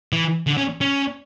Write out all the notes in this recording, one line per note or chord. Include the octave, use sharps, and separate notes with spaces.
E3
D3
C#4
C#4